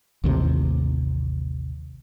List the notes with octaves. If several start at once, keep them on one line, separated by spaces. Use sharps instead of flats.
A1 D#2 C3